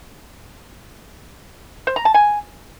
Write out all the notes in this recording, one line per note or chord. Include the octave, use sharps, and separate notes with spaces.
C5
A#5
A5
G#5